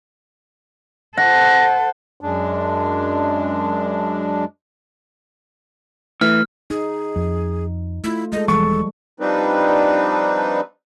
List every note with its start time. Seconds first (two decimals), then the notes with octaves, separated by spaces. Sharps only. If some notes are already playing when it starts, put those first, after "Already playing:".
1.17 A4 C5 F#5 A#6
2.21 F#2 G#3 D4
6.21 E3 A3 F6
6.70 D#4 G#4
7.16 F2
8.04 A3 E4 F4
8.32 G#3 A4 D#5
8.48 E1 E3 F3 G3 G#3 A4 C#6
9.20 F3 G3 C4 D4 D#4 B4